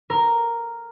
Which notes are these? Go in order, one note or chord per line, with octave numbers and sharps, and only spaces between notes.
A#4